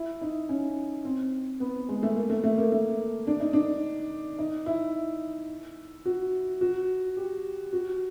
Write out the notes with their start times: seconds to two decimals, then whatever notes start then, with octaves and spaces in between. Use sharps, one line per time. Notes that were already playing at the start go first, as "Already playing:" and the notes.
Already playing: E4
0.21 D#4
0.49 C#4
1.05 C4
1.60 B3
1.89 G#3
2.03 A3
2.16 A#3
2.30 A3
2.44 A3
2.58 A#3
2.72 A3
3.27 D4
3.40 D#4
3.53 D4
4.39 D#4
4.66 E4
6.05 F#4
6.61 F#4
7.17 G4
7.73 F#4